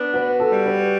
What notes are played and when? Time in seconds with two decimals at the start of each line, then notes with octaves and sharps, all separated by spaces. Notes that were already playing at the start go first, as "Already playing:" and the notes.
Already playing: B3 D4
0.14 F#4 B4
0.40 A4
0.52 G3
0.66 B4